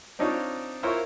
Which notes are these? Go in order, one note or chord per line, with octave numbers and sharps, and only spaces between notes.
C4 D4 D#4 F4 C#5
E4 F4 A#4 C5 C#5